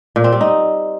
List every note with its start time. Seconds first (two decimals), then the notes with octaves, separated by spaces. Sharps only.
0.16 A#2
0.24 C4
0.32 G3
0.41 D#4